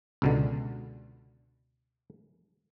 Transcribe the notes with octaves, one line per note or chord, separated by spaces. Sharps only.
C#2 B2 D3